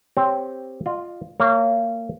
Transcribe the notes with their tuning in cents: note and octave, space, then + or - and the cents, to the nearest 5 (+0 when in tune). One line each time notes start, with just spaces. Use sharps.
C4 +0 G4 +5 C#5 +0
F4 +0 D#5 -45
A#3 -30 C#5 +0